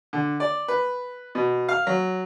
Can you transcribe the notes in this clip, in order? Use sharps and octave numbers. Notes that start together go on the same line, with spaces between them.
D3
D5
B4
B2
F5
F#3